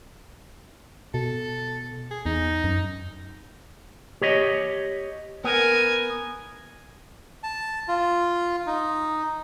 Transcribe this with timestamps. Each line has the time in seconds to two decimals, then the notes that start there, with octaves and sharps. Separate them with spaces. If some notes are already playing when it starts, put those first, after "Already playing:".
1.14 B2 A4
2.11 G#4
2.26 E2 D#4
2.64 F#2
4.22 G4 C#5 D#5
5.44 B3 A#4 G#5
7.43 A5
7.88 F4
8.67 D#4